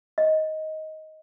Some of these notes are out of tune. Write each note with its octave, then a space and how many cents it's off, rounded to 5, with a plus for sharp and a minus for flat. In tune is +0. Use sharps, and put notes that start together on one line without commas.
D#5 +10